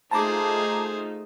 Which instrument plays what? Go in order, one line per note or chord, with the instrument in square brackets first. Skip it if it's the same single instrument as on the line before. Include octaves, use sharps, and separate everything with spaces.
[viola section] A3 D#4 F4 [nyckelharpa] G#4 C5 [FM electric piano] A5 A#5 D6